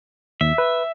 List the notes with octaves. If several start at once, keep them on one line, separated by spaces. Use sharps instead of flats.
D#2 E5
B4